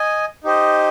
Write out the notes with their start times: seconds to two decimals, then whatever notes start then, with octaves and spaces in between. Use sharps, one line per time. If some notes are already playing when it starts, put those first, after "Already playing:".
Already playing: D#5 G#5
0.44 D#4 G4 C5 D#5